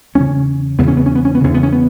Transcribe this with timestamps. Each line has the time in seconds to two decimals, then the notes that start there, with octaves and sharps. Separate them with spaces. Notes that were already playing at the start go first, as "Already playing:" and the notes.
0.15 E2 C#3 C#4
0.79 E2 C#3 B3
0.88 C#4
0.97 B3
1.06 C#4
1.15 B3
1.25 C#4
1.35 B3
1.40 E2 C#3 C#4
1.54 B3
1.63 C#4
1.73 B3